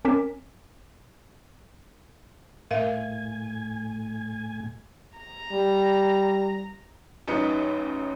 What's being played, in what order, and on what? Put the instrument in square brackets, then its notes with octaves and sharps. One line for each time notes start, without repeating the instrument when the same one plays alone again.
[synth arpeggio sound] C4 C#4 A#4 D6 B6 E7
[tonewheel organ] A2 G#5 [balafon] A#4 E5 F5
[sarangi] A#5
[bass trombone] G3
[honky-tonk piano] A1 F#2 D#4 B4 D#5 C#7